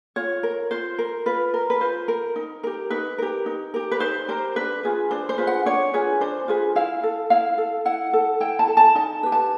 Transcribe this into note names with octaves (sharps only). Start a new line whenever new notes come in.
F4 C#5
A#4
F4 C5
A#4
F4 B4
A#4
B4
F4 C5
A#4
D#4
G4 A#4
D#4 B4
G4 A#4
D#4
G4 A#4
B4
D#4 C5
G4 A#4 C5
D4 B4
F4 G#4 B4
D4 C5
C5
F4 G#4 B4
F#5
D4 C#5
F4 G#4 B4
D4 C5
F4 G#4 B4
E4 F5
A4
E4 F5
A4
E4 F#5
A4
E4 G5
A5
A4
A5
D#4 A5
G4 B4
A5